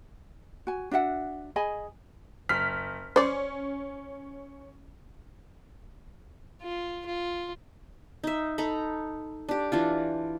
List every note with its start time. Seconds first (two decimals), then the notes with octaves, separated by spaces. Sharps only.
0.67 F#4 G#5
0.91 D4 F#4 E5 F#5
1.56 G#4 D#5 G#5 B5
2.49 F#1 F6 B6
3.16 C#4 C5 D5
6.62 F4
7.06 F4
8.24 D#4 E5
8.58 D#4 A4 A#5 B5
9.49 D4 G4
9.72 E3 D4 F4